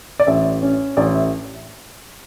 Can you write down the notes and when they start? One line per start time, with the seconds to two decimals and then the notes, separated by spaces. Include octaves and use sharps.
0.20 D5
0.27 A1 E5
0.62 C#4
0.97 A1 D5
1.15 E5